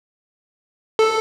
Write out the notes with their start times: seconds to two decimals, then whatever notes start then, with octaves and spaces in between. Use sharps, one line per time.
0.99 A4